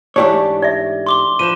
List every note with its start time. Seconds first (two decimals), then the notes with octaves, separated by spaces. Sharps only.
0.16 G#2 E3 A3 D4 G4 C#5
0.62 D5 E5
1.07 C6 D6 G7
1.39 F3 B4 D#7 E7